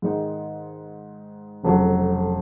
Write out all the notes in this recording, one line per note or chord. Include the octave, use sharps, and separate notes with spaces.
G#2 D#3 G#3 D#4
F1 F2 C#3 F#3